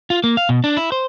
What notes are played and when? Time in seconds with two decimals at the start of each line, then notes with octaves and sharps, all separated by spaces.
0.10 F4
0.24 A#3
0.37 F5
0.49 B2
0.64 D4
0.77 E4
0.92 C5